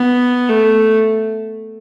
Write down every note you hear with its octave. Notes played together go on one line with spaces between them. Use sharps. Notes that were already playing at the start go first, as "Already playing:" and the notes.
Already playing: B3
A3